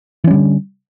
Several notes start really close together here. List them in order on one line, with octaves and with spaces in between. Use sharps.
E3 C#4 G3 D3